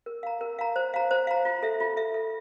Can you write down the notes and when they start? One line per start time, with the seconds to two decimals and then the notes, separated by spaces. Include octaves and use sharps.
0.06 A#4
0.23 F5 A#5
0.41 A#4
0.59 F5 A#5
0.76 C5
0.94 F5 A#5
1.11 C5
1.27 F5 A#5
1.45 F4
1.63 A4 E5
1.80 F4
1.97 A4 E5
2.14 A4